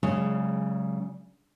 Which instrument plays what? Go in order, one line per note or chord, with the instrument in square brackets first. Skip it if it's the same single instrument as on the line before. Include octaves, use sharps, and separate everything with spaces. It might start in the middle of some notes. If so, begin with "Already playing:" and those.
[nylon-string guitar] C#3 [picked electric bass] F#3 G#3